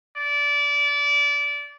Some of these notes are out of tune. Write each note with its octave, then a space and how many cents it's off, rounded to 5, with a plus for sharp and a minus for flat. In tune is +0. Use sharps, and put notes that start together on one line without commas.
D5 -25